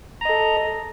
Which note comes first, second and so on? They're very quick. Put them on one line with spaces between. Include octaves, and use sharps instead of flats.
A#5 D#5 A4